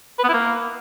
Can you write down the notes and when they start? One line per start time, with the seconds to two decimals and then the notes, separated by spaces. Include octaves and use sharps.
0.19 B4
0.24 B3
0.29 E4
0.34 A#3